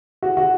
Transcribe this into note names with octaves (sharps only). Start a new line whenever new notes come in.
F#4
F#4